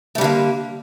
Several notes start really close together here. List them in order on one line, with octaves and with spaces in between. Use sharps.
A3 G3 D3 A#3